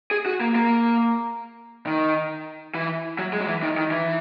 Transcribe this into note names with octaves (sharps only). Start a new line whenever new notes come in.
G#4
F#4
A#3
A#3
D#3
E3
F#3
G#3
F#3
E3
D#3
D#3
E3